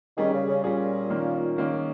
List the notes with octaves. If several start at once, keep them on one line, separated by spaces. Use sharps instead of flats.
D#3 G3 C#4 G#4
C#3
C#3
A#2 G3 C#4 G#4
D#3 A#3 C#4
D#3 A#3 C#4